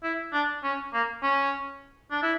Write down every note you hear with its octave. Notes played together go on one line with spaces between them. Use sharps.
E4
D4
C#4
A#3
C#4
D4
E4